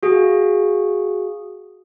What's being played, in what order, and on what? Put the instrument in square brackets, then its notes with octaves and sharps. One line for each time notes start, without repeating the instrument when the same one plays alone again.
[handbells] F#4 G#4 F5 C#7